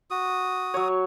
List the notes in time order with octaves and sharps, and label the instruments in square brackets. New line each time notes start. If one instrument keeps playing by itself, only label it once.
[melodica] F#4 D#6
[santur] F#3 C#5